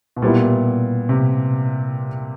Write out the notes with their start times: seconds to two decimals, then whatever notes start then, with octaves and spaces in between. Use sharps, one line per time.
0.16 B2
0.22 A#2 G3 B3 E4
1.09 C3